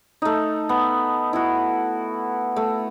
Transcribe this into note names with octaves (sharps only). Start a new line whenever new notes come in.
A3 D#4
B3
E4 F#4
A3